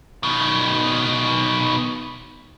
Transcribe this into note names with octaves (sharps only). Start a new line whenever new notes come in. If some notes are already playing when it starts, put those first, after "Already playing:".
B2 D#3